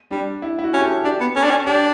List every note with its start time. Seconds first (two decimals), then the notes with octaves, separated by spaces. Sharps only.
0.11 G3 D4
0.42 E4
0.59 E4
0.64 F#4
0.74 C#4
0.79 G4
0.84 A4
1.04 D4 G4
1.20 B3
1.36 C#4 A4
1.44 D4
1.51 C#4
1.66 D4 G4